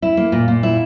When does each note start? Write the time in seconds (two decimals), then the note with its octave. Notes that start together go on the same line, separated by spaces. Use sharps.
0.02 E4
0.17 A#3
0.32 A#2
0.48 A#2
0.63 E4